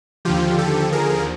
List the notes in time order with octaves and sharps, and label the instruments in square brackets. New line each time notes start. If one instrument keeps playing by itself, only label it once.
[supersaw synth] D#2 D3 F3 F4 G4
G4 A4
G#4 A#4